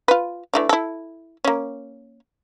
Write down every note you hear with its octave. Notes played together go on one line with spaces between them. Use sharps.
F4 B4
E3 A3 D4
E4 A4
A#3 C#4